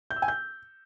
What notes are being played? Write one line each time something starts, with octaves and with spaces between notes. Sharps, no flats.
G6
E6
G#5
G6